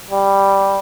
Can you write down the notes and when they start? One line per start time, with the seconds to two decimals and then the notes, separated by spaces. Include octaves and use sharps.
0.11 G3